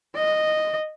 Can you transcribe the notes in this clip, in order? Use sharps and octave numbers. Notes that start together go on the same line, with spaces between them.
D#5